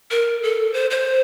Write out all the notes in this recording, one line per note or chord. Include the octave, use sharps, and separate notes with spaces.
A#4
A4
C5
C5